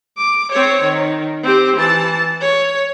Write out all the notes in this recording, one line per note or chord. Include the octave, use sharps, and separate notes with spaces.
D6
C4 C#5
D#3
C4 G4
E3 A5
C#5